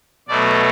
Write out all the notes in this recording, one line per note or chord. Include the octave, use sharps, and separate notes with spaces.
B2 F#3 A3 D5